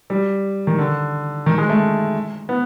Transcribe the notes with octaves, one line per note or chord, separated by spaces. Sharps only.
G3
D#3
D3
D#3
G#3
A3
B3